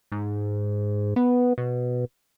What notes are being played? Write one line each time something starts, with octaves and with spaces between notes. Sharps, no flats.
G#2
B3
B2